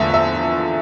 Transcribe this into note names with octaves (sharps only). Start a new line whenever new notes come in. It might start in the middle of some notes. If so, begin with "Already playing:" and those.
Already playing: E2 D3 F3 A3 E5
E5